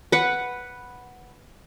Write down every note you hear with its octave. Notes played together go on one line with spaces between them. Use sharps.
B4 F#5